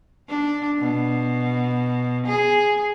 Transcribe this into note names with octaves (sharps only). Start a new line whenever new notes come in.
D4
B2
G#4